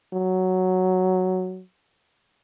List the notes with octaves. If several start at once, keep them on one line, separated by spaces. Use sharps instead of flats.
F#3